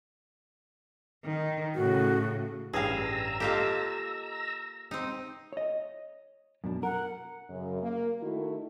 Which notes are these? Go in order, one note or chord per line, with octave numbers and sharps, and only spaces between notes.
D#3
A2 C#3 F#4
A1 G2 G#4 F5 G5 A#5 E6
A#3 F4 G4 A4 D#5
C4 D#4
C#5 D#5
F#2 B2 D4
A#4 F#5
F#2 C#3
A#3
D#3 A3 E4 F#4